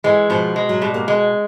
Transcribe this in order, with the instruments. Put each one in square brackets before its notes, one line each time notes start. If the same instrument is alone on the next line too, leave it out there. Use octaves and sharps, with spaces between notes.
[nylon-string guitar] E3 [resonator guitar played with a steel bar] G#3
[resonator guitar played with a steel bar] B2 [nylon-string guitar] F3
[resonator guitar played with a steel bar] G#3
[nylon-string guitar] F#3
[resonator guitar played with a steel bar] B2 [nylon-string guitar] G3
[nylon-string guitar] A#3
[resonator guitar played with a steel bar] G#3